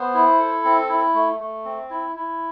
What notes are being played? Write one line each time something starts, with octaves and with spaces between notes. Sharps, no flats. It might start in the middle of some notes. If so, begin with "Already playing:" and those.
Already playing: B3 C5
E4
A4
C4
E4
A3
A3
C4
E4
E4